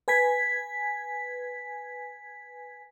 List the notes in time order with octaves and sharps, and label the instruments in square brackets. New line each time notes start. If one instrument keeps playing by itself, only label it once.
[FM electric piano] B4 G#5 G#6 B6